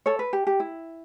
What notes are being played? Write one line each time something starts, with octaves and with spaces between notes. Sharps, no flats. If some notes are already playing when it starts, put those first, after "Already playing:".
A4 C#5
B4
G4
G4
E4